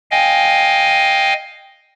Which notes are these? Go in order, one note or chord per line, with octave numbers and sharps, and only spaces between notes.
D#5 F5 G5 G#5